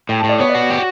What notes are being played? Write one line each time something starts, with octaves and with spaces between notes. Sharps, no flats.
A2 G5
A5
A2
D5
B3 C#5
D5
F#4
G4